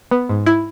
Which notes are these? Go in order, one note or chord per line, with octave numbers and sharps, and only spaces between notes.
B3
G#2
E4